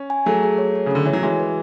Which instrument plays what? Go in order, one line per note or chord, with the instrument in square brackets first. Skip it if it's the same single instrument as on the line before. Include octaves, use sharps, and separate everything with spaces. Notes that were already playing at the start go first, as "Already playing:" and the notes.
Already playing: [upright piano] C#4
[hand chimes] G#5
[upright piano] F#3 A3 [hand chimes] G#4
[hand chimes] G#4
C#5
G#4
[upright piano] C#3
[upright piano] D3 [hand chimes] C#4
[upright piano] E3 [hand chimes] C#5
[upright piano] F#3
[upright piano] E3 G#3 [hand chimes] F#4
[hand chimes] B4